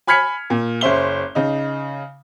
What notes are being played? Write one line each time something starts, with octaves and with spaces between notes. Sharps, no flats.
G#5 B5 F6 G#6 B6 C#7
A#2
F#1 C#4 C5 E5 G7
C#3 D#4